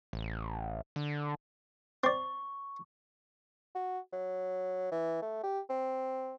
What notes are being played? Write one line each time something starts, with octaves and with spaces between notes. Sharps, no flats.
A1
D3
C4 D5 C#6
F#4
F#3
E3
A3
G4
C4